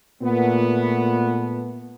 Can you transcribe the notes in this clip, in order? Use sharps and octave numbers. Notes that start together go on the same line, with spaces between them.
A#2 A3 B3